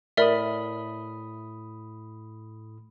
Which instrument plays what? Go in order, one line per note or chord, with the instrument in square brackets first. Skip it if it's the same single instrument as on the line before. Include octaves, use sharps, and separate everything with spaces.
[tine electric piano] A2 B5 D#6 [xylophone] A#4 D5 E5